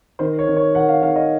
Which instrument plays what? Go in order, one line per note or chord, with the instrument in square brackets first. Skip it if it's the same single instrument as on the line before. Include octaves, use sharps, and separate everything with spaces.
[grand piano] D#3 C5
C#5
D#3
C#5
D#3 F#5
F5
D#3 F5
D#5